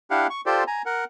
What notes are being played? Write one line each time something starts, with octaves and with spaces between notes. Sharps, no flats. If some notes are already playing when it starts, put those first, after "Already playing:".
D4 E4 G4 F5 F#5
C#6
F4 G4 A4 C5 D5
G#5 A#5
A#4 F#5